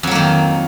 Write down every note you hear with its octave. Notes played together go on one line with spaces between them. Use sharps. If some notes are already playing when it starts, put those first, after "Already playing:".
F2 D#3 F#3 A#3